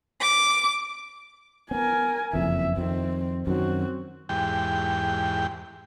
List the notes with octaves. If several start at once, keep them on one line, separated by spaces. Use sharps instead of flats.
D6
B3 C4 A#4 G#5
F#1 F2 E3 E5
F2 D#3 C4
F#2 D#3 F#3 C4 F#4
E2 G#2 G4 G5